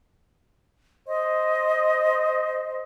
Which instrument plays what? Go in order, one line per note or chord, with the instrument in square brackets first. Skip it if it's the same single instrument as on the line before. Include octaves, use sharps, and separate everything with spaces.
[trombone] C5 [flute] D#5